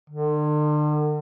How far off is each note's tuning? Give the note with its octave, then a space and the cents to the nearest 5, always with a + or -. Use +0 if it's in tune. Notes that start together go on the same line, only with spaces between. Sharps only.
D3 +40